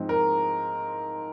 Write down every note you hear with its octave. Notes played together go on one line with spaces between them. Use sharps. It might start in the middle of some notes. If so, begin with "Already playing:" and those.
Already playing: G#2 F3 G#3 C4
A#4